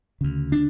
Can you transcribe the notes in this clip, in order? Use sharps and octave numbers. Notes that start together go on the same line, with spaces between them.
D2 C#3
D4